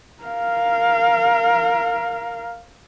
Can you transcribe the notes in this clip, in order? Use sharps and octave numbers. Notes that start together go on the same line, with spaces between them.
A#4 F5